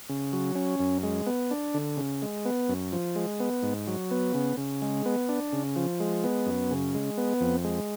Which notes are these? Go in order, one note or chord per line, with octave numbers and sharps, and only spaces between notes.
C#3
F#3
C#4
F#2
G#3
B3
D4
D3
C#3
G#3
B3
F#2
F3
G#3
B3
G#2
F#3
B3
C#3
C#3
G#3
B3
D4
C#3
F3
G#3
B3
F#2
C#3
G#3
B3
F2
G#3